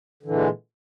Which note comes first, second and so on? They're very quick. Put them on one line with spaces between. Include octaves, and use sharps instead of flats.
D3 E3 A#2 G#3